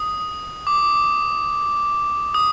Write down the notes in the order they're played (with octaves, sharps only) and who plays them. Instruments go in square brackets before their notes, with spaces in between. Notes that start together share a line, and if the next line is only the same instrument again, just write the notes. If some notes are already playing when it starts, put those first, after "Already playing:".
Already playing: [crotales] D#6
D6
D#6